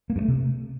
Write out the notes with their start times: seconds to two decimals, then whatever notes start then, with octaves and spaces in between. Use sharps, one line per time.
0.10 A#3
0.16 G2
0.22 A3
0.28 C3